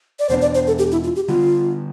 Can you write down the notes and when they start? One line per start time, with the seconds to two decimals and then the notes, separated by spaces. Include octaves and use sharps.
0.19 D5
0.29 E2 B2 B3 D4 C5
0.42 D5
0.54 C5
0.67 A4
0.78 G4
0.92 E4
1.04 F4
1.16 G4
1.28 D3 G3 B3 F4